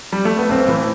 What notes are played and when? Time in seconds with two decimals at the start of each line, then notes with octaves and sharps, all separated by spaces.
0.12 G3
0.25 A3
0.38 B3
0.49 B1 C4
0.68 A2 E3